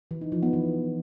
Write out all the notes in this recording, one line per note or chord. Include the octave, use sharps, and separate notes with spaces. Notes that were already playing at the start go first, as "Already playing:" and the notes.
E3
D#4
F3
B3
E3